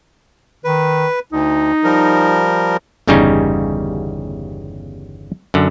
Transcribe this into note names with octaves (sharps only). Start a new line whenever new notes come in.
D#3 B4
D2 D#4
F3 G3 A#4
G1 E2 C#3 G3 C#4 D#4
F#2 D3